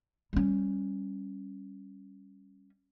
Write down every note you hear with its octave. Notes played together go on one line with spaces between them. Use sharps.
G3 C#4